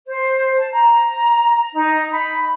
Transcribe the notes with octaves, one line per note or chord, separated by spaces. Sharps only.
C5
A5
A#5
D#4
B5